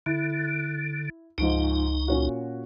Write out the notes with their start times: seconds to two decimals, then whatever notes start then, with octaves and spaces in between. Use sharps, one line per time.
0.06 D3 E4
1.38 C#2 G#2 F3 D#4 D7
2.08 A#2 C#4 F#4